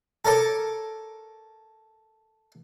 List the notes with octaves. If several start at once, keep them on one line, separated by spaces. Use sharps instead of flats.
A4 A#4 C#5 A5 D6